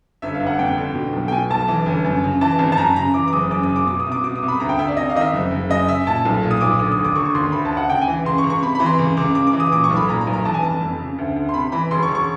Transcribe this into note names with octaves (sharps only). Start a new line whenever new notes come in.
G1 E5
F5
G1
F#5
F2 G5
D3
B2
B1
G5
B2 G#5
B1 A5
E3
G1
F#2
C#3
E3 A5
G#1
A5
F#2 A#5
C#3 A#5
E3 D6
D6
F#1 D#6
F#2 D6
D#6
C#3
D6
B2 D6
D#6
C2
D6
B2 D6
D#6
C2
B5
D2 A#5
G5
D2 E5
D5
C3 D#5
F5
D#3 D#5
E5
F#1
F#1
F#2 D#5
C#3 E5
A#2 A5
B1
A#2
D#6
B1 D6
D3 D#6
D#6
D#2
D6
D3 C#6
C#6
D#2 C6
D2 B5
A5
D2
F#5
C#3 G5
G#5
E3
C#2 C6
C#6
C#2
C#6
C3 B5
E3 B5
C6
C#2
C#2 D6
C#3 D6
D6
E3
D#6
A#2 D6
C#6
B1
B5
A#2 A#5
A#5
B1
A#5
E3 A5
G#5
F1 A5
F2
C#3
D2
D2
C6
C3 B5
E3 B5
E1 C6
C#6
E1
C#6